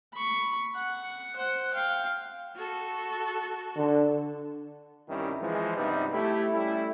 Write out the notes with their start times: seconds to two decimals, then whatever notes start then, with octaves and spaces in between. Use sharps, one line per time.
0.13 B5 C#6
0.75 F#5
1.36 C5 F#5
1.74 F5 G5
2.56 F#4 A4
3.77 D3
5.09 C2 G2 D#3 G3 C#4 E4
5.41 E3 F3 G#3
5.77 G2 C3 G3 B3 D#4
6.13 A3 E4 G4
6.53 G3 A3 C#4 E4